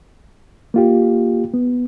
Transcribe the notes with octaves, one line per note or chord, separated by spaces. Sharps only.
A#3 F4 G4
B3